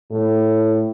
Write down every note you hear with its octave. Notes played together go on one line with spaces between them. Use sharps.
A2